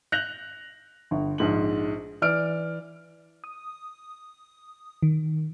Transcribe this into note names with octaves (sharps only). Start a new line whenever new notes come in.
F#6 G6 A#6 F7
G1
A#1 G#2 F#7
E3 D5 F6 D7
D#6
D#3